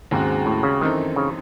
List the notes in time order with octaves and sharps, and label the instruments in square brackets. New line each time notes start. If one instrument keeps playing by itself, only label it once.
[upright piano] D#2 C#3 G#3 C4 F#4 [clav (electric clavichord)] G#2
[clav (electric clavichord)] A2
C#3
[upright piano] F#2 E3 C4 D#4 A4 [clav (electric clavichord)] D#3
[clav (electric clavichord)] C#3